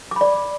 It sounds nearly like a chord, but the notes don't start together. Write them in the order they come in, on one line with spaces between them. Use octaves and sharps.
D6 B5 D5